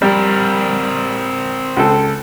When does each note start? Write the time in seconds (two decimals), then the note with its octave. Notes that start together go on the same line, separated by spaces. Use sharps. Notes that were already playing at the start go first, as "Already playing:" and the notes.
0.02 G3 C4 A#4
1.77 C#2 A4